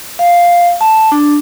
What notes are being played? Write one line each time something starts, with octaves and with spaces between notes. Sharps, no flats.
F5
A5
D4